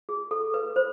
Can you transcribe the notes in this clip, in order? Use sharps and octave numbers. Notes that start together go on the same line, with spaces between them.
G#4
A4
B4
C5